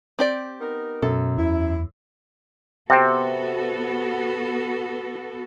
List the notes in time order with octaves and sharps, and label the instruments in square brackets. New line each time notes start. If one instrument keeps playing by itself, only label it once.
[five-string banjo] C4 G4 D5
[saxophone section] B3 D#4 A#4
[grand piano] F#2 [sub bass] B2 [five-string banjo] A4
[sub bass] E2 [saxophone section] E4
[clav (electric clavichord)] C3 C4 [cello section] B3 F#4 A4 [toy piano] E5 G5